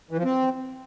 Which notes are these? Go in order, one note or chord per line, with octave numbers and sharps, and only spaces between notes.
E3
F3
C4